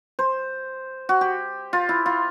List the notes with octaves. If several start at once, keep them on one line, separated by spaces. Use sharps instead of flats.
C5
F#4
G4
F4
E4
F4